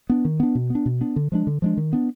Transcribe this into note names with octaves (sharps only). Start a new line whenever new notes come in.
B3 D4
D#3
B3 D4
B2
B3 D4
B2
B3 D4
D3
F3 G#3 D4
D3
F3 G#3 D4
D#3
B3 D4